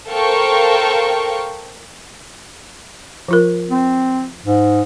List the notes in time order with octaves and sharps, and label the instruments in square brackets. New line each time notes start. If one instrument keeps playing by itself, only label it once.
[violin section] A4 A#4 C5 F5 G5 C#6
[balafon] F3 F4 A#4
[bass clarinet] C4
G#2